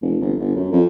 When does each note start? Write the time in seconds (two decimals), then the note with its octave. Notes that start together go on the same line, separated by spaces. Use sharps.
0.02 F1
0.21 G1
0.40 G1
0.56 F#2
0.72 F2